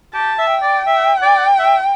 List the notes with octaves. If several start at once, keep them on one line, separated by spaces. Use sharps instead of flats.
G4 A5
E5
G5
D5
E5
D5
E5